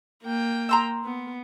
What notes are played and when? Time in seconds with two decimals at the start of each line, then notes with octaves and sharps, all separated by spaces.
0.24 A#3 G5
0.69 A#5 C6 E6
1.05 B3